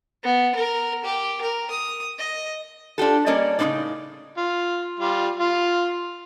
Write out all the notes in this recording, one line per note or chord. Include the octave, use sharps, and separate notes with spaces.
B3
A#4
G4
A#4
D#6
D#5
D4 F4 G4 A4
G3 A#3 C#4 D5 D#5
A2 C#3 F3 C4 D#4 D5
F4
G3 F4
F4